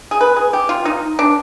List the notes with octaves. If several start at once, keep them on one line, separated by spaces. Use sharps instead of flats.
G#4
B4
G#4
G4
F4
D#4
D4